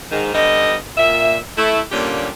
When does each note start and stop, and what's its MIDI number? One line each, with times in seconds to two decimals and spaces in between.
0.11 0.31 44
0.11 0.31 51
0.34 0.76 50
0.34 0.76 55
0.34 0.76 59
0.34 0.76 75
0.97 1.37 46
0.97 1.37 76
1.57 1.80 57
1.57 1.80 64
1.91 2.29 46
1.91 2.29 50
1.91 2.29 55
1.91 2.29 58
1.91 2.29 61
1.91 2.29 67